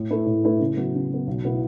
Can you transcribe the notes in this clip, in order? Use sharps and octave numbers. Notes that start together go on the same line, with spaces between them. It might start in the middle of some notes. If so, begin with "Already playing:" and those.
Already playing: A2
A3 E4 B4
A2
A3 E4 B4
C#3
F#3 B3
C#3
F#3 B3
B1
B2 B3 E4